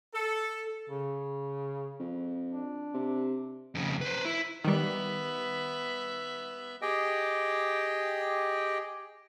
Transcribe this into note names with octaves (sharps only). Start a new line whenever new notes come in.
A4
C#3
F2
D4
C3
F2 C#3
B4 C5
E4
D#3 G3 B3 E5
G4 G#4 D#5 G5